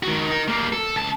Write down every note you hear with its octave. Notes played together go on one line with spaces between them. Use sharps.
D#3 F#4
D#4 A#4
G3 A#3
A4
C#2 A5